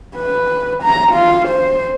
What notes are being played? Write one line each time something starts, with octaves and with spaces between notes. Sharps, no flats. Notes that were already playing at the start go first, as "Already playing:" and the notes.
B4
A#5
F4
C5